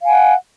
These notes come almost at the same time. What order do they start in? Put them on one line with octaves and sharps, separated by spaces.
F5 G#5 F#5